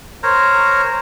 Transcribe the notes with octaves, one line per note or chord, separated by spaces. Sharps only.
A#4 C5 C#5 A#5